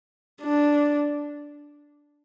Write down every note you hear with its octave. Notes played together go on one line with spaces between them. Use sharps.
D4